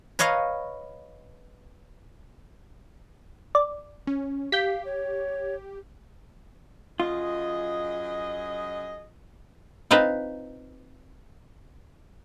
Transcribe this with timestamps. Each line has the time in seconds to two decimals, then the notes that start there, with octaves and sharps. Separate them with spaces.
0.19 B4 C#5 D#5 F5 A#5
3.55 D5
4.07 C#4
4.52 G4 F5 G6 B6
4.85 C#5
7.00 F#2 F4 G#4 D#5
9.91 C4 D#4 F4 B4 C5